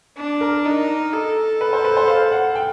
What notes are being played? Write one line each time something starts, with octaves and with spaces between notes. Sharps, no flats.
D4
A#4
D#4
A4
B4
C5
B4
C5
F5
F#5
G5